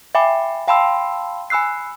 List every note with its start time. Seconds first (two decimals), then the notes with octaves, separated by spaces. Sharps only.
0.15 E5 G5 G#5 B5 D6
0.68 F5 G5 A5 B5 C6 E6
1.50 G#5 B5 E6 F#6 C7